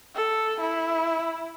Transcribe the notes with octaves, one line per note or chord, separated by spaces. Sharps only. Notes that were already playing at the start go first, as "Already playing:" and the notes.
A4
E4